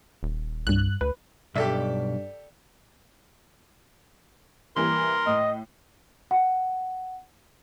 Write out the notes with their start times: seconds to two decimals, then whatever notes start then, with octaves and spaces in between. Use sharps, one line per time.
0.23 D#1
0.67 C2 G2 F#6
1.01 D2 B4
1.55 B1 G2 G4 A4 D5 E5
4.77 E3 G3 A#3 A#4 C6
5.27 A2 D#5
6.31 F#5